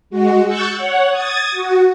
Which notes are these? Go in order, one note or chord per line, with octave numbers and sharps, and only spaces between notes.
G#3 F#4
C#6 E6 F#6 G6 A6
C#5 F#5
D#6 G#6 A6
F#4